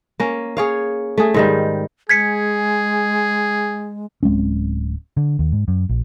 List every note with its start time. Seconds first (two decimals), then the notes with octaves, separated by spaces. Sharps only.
0.20 A#3 C#4
0.57 G#4 C#5 F5
1.18 A3 G#4
1.34 G#2 D#3 G3
2.09 G#3 G#4 G#6 B6 C#7
4.23 D1 G#3 C4 C#4
5.17 D3
5.39 D#2
5.52 G#2
5.68 F#2
5.89 A#1